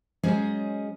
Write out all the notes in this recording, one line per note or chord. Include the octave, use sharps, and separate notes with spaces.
F#3 G#3 C#4 G#4 C5 D#5